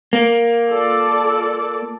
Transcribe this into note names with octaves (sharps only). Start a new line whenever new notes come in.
A#3
F4 A4 D5